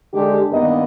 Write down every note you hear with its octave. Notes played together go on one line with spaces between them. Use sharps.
D3 G#3 D4 G4
G2 D#3 A#3 B3 A#4 D#5